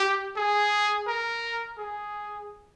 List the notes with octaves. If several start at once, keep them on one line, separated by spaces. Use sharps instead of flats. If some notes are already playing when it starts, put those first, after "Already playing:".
Already playing: G4
G#4
A#4
G#4